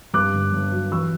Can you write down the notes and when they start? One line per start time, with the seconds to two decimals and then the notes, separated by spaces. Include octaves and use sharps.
0.13 G2 D6 F#6
0.33 G1
0.52 G1
0.72 F#3
0.91 E3 C#6 E6